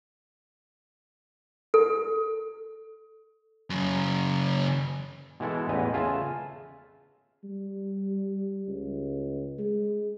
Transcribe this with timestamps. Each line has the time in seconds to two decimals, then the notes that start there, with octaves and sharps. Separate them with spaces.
1.74 A4
3.70 F#2 C#3
5.40 B2 E3 G#3 E4 A4
5.69 A1 E2 E4 B4 D#5 A#5
5.94 C#3 F4 E5 G#5 A5
7.44 G3
8.68 C#2
9.59 G#3